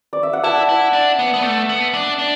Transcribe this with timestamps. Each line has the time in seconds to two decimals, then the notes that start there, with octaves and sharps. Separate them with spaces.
0.13 D5
0.23 E5
0.33 F#5
0.43 E4 E5 A5
0.69 E4
0.93 D4
1.19 B3
1.34 B3
1.44 A3
1.69 B3
1.94 D4
2.19 D4